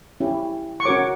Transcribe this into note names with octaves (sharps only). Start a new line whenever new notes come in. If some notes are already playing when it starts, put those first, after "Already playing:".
C#4 E4 G4
C#6
C#4 F#4 A#4 C#5 D6